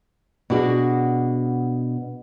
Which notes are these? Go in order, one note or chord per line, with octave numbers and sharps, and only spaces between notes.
B2 D4 F#4 G#4